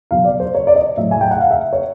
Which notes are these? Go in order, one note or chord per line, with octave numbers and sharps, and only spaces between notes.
B2 F#3 F5
D5
C5
C#5
D5
D#5
A2 F#3 E5
G#5
G5
F#5
F5
E5
C#5